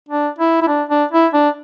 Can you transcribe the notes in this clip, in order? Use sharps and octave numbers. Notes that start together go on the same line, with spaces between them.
D4
E4
E4
D4
D4
E4
D4